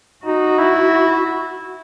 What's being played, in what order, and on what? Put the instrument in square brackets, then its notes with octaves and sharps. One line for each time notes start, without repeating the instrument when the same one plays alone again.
[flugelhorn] D#4 [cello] F#4
[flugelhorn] E4